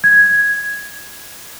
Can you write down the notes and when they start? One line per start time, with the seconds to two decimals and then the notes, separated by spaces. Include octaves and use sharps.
0.04 G#6